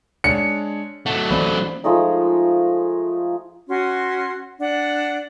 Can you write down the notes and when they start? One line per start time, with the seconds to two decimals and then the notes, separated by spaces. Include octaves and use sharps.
0.24 G#3 D4 C#5 C#7
1.06 F#3 A3 F#5
1.31 E3 A#3 C#4 C5 D5 B5
1.84 F3 G#3 A3 D#4
3.69 C#4 F#4 C6
4.59 D4 F#5